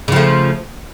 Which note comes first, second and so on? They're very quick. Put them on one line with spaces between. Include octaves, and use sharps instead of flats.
C#3 F3 A3